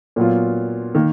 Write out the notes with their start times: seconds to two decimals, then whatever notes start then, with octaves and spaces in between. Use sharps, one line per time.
0.16 A#2 F#3 B3 F4
0.95 D#3 A#3